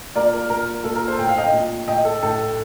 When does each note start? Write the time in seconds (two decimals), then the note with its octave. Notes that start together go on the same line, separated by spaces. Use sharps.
0.15 A#2 A#4 D5
0.33 A#4
0.49 A#2 A#4
0.84 A#2 A4
0.95 A#4
1.08 A4 C5
1.18 A2 G5
1.29 F5
1.38 D#5 G5
1.53 A#2
1.87 A2 D#5 G5
2.05 A4
2.22 A2 A4